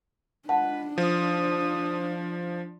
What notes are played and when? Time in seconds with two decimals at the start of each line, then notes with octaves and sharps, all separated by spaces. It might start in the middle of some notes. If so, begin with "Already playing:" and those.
0.49 G#3 D4 F4 B4 F#5 A5
0.98 F3 D#6